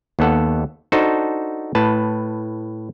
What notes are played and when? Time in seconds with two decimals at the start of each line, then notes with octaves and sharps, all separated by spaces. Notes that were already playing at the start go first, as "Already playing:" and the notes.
0.19 D#2 B3 A4 F#5
0.92 D4 D#4 F#4 A4 C5 A5
1.75 A2 B4 A5